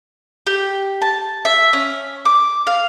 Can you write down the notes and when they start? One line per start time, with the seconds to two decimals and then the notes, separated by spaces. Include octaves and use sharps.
0.47 G4
1.02 A5
1.45 E5
1.73 C#4
2.25 D6
2.67 F5